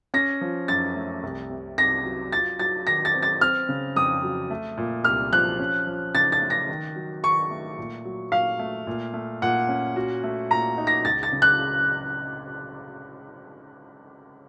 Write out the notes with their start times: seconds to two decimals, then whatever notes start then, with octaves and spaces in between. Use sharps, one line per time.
0.14 C#4 A#6
0.41 F3
0.68 F#2 A6
0.96 A3
1.23 C2
1.50 C3
1.78 C2 A#6
2.05 F#3
2.32 F4 A6
2.59 F#3 A6
2.87 D#3 A#6
3.05 A6
3.14 C4
3.23 A6
3.41 C4 F6
3.69 C#3
3.95 F2 D#6
4.23 F#3
4.51 A3
4.77 A#2
5.04 C2 F6
5.32 F3 F#6
5.59 C#4
5.87 F3
6.15 C#3 A6
6.32 A6
6.42 A3
6.50 A#6
6.69 D#3
6.96 F#3
7.23 D#3 C#6
7.51 A3
7.78 A#2
8.05 F#3
8.32 A#2 F5
8.59 A3
8.87 A#2
9.14 A3
9.42 A#2 F#5
9.69 C#4
9.96 F#4
10.24 A3
10.51 A#2 A#5
10.78 D#4
10.87 A#6
11.05 C#2 A6
11.23 A6
11.32 C#3
11.42 F#6